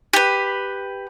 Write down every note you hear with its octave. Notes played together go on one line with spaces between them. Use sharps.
G4 B4